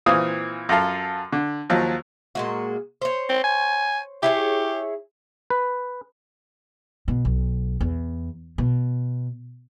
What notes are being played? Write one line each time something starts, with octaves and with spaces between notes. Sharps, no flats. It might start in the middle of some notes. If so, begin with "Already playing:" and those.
A#2 E3 C4 F5 D#6
F#2 F4 A4 F5
D3
D#2 F3 F#3
A#2 G#3 F#4
C5 C#5
C4
G#5
E4 G4 G#4 C#5
B4
B2
B1
E2
B2